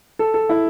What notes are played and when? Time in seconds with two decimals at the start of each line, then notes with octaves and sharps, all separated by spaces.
0.19 A4
0.34 A4
0.49 E4